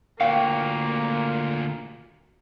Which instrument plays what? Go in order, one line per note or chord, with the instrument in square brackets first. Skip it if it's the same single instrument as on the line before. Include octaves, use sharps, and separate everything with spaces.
[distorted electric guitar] D2 A#2 [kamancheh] A#3 [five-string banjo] F#4 F5 G5